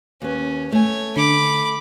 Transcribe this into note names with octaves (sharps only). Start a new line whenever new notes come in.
D#2 C#4 B4
A3 C#5 G#5
D3 B5 D6 C#7